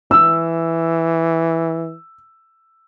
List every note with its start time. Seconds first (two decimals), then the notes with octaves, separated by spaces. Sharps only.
0.11 E3 E6